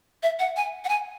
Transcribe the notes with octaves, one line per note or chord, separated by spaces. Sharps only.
E5
F#5
G#5
F#5
G#5